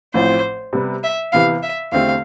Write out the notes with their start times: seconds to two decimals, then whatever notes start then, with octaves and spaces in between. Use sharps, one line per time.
0.14 A1 A2 F3 C4 C5
0.73 C3 G3 B3
1.04 E5
1.32 C3 E3 B3 E4 F5
1.63 E5
1.92 E2 D3 A3 C4 G4 F5